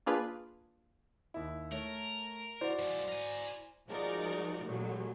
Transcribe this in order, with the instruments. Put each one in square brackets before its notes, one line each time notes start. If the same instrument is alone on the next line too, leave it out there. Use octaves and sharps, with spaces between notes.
[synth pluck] A#3 D4 F4 G#4 B4
[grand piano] D#2 E4
[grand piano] A3 C#5 [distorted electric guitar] A#4
[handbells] E4 D5 [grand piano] F#4 C5
[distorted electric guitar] F3 G#3
A#4 G#5
[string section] F3 G#3 D#4 F#4 A#4 D5
A1 A#2 F#3 G#3